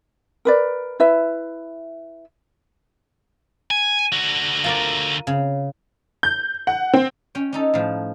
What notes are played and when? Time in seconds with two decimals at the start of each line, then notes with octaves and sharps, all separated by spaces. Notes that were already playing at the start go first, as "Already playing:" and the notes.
0.45 A#4 B4 D5
1.00 E4 B4 E5
3.71 G#5
4.12 D3 F#4
4.64 F4 A#4 D5
5.27 C#3
6.23 G6
6.67 F#5
6.93 C4
7.35 C#4 G5
7.53 C#4 D#4 A4
7.74 A2 F3